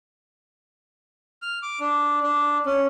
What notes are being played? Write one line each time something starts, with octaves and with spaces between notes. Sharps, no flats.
F6
D6
D4
D4
C#4